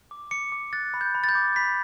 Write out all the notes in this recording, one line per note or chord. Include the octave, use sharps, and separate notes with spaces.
D6
D6 C#7
D6
F#6 A6
B5
G6
B5
A6
G6
D6
B5 B6